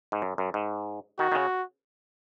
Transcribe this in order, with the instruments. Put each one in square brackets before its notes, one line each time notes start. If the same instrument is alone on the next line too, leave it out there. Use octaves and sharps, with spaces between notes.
[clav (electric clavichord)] G#2
F#2
F#2
G#2
[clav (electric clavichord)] D#3 [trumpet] F#4
[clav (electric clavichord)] D#3
C#3